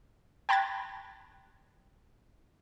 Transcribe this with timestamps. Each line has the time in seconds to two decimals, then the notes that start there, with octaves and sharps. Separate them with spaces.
0.49 G5 A5 B5 F#6 G#6 A6